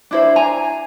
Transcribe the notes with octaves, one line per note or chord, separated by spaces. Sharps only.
D4 E4 C5
G#5 A#5